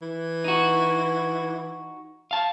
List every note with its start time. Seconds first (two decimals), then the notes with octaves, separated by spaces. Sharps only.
0.02 E3
0.44 D#4 F#4
2.31 F5 A5